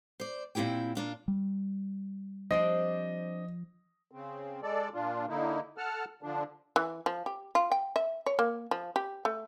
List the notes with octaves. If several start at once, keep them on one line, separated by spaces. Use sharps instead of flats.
C5 D5
A#2 C4 E4 G4 G5
A#2 D4 F4
G3
F3 C4 D4 G4 D#5
C#3 C4
G#3 A4 D5
A#2 D4 F4
D3 A#3 D#4 E4
A4 F#5 A5 F6
D3 F3 D4
E3
F3
G4
F4
G5
E5
C#5
A#3
F3
G4
A3